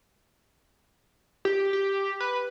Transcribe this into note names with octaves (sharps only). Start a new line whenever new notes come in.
G4
G4
B4